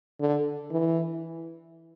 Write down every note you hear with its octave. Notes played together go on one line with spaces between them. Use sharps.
D3
E3